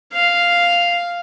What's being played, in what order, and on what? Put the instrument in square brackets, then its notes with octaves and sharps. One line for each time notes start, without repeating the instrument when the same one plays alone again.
[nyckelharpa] F5